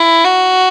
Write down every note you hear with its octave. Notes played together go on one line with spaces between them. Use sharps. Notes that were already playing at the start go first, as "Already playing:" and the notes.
Already playing: E4
F#4